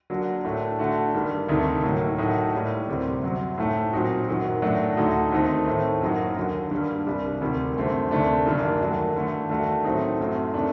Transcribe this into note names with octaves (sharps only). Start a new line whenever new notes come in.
D3 F#3 A#3 D4 F#4
A2 A3 D4
D3 A3 D4 F#4
G2 D#3 G3
D2 C3 D#3 A3 D#4
A2 F#3 A#3 D#4
A2 F#3 A3 D#4 F#4
A2 G3 A#3
D2 C3 G3 C4
F#2 F#3 C4 F#4
A2 A3 D#4
A#2 F#3 C4 D#4 F#4
F#2 D#3 F#3
A2 F#3 A3 D4 F#4
D2 D3 A3 D#4 F#4
D#2 D#3 A3 C4 D#4
A2 A3 C4
F#2 F#3 A#3 D#4 F#4
D#2 D3 F#3
G2 D3 G3 A#3
C2 C3 G3
D2 C3 D#3 G3
F#2 D3 A3 C4
D2 C3 D#3 A3 D4
F#2 D#3 G3 A#3 D4
D#2 D#3 F#3 A3 D4
G2 D3 A3
D#2 D#3 A3 D4 F#4
A2 F#3 A3 C4 D#4
F#2 F#3 A3 C4
C3 D#3 A3 D4